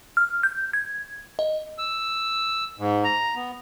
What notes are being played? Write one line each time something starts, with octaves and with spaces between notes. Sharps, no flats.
F6
G6
G#6
D#5
E6
G#2
A#5
B3